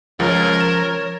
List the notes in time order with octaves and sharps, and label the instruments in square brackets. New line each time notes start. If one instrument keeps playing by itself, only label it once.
[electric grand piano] C#2 A6 [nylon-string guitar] F3 C#4 [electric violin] A#4 [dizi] C#5
[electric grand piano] E7